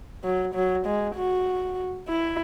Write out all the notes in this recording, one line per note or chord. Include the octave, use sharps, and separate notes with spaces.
F#3
F#3
G#3
F#4
E4